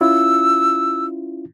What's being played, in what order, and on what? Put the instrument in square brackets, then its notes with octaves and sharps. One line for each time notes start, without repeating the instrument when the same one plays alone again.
[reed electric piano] C#4 E4 F4 [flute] E6